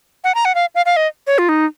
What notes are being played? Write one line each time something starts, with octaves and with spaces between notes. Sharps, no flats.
F#5
A#5
F#5
F5
F5
F5
D#5
C#5
F4
D#4